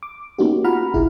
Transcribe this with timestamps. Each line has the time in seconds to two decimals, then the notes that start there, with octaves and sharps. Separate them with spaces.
0.03 D6
0.38 A#3 B3 C#4 D#4 F#4 G4
0.64 F4 F#5 A#5 B5 F6
0.93 G1 C2 E4 G#4